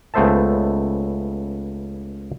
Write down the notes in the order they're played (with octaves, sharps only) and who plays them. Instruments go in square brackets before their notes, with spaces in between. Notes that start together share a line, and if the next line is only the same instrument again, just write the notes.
[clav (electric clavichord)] C#2 A3 B3 C5 E5 A5